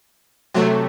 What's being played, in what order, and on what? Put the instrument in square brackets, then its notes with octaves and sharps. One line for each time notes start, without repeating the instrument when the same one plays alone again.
[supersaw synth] C3 F#3 A3